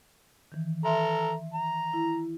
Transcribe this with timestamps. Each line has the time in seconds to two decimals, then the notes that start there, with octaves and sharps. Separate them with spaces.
0.52 D#3 E3
0.85 A4 E5 A#5 C6
1.54 A#5
1.93 E4